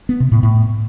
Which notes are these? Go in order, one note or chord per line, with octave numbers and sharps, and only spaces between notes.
B3
C3
A2
A2